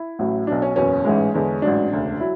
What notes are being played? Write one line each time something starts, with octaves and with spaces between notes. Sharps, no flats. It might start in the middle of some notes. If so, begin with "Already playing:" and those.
Already playing: E4
A1 A2 F#3
B1 B2 F#3 D4
C#4
F#1 E2 B2 C#4
A1 G#2 E3 G#3
E2 D3 G#3
A1 G#2 F#3 D4
E1 D2 C#3
F#3 E4